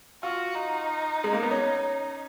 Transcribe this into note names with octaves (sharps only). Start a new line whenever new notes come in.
F4 F#4
D#4
G#3
A#3
B3
C#4